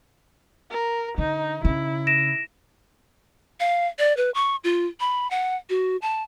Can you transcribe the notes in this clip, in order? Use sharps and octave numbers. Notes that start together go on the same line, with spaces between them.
A#4
D3 D#4
C#3 E4
A#6 D7 E7
F5
D5
B4
C#6
F4
B5
F#5
F#4
A5